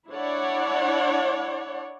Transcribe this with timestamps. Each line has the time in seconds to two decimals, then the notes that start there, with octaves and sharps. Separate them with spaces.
0.11 D4 E4 C#5 D5 F#5